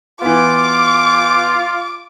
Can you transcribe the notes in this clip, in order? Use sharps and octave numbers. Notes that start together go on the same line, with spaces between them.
E3 B3 F4 D6